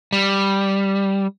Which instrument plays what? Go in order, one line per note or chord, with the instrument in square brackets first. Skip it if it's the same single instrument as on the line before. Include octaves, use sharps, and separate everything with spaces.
[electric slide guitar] G3